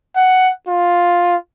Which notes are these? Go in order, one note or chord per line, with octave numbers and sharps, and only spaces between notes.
F#5
F4